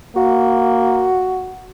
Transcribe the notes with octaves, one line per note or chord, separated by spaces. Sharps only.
A#3 F#4